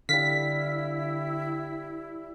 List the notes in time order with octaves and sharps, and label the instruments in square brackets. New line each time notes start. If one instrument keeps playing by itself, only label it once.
[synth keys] D3 [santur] G3 F5 [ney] E4 [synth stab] B6